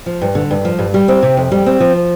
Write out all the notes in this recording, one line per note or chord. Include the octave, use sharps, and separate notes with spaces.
F3
G2
D3
G2
F3
G2
G3
C4
C3
F2
G3
C4
F3